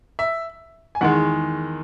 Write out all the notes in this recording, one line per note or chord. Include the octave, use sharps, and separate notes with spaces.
E5
G#5
E2 D#3 G#3 F#5